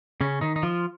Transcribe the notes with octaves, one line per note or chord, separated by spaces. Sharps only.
C#3 C#4
D#3 D#4
D#4
F3 F4